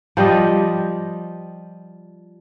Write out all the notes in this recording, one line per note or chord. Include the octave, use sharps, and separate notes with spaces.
F3 G3 D5 D#5